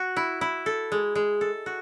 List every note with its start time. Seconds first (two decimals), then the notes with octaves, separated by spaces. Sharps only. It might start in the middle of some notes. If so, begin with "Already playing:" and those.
Already playing: F#4
0.17 E4
0.41 E4
0.66 A4
0.92 G#3
1.15 G#3
1.41 A4
1.66 F#4